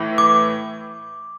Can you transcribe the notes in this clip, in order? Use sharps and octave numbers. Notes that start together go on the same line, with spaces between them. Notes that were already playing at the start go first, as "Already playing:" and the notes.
Already playing: A2 E3
D6